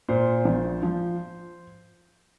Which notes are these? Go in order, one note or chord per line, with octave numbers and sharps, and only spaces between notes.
A#2 C5
A#1
F3